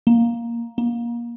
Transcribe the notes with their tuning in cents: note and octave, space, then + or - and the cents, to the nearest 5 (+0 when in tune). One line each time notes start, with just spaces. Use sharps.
A#3 +5
A#3 +25